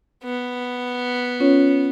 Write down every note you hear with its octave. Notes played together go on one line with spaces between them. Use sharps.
B3
C#4 F4 C#5